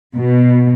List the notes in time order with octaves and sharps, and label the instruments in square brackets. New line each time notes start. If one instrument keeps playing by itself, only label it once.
[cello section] B2